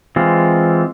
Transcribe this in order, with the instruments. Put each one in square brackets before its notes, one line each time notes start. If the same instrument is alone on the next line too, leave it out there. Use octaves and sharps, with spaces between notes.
[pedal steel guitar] E3 G#3 C4 F4